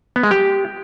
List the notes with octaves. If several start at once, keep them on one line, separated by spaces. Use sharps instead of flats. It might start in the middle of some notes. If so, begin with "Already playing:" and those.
B3
G#3
G4